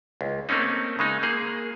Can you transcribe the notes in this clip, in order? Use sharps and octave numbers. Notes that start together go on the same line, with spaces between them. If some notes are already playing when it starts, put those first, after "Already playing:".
C#2
A3 A#3 C4 C#4 D#4
C#3 G#3 D#4
A#3 G#4